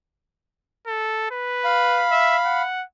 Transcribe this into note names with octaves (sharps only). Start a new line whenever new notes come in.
A4
B4
F5 B5
E5
F#5